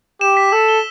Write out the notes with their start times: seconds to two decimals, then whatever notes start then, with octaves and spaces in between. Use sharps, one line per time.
0.21 G4 E7
0.37 B6
0.52 A4 E6
0.69 G7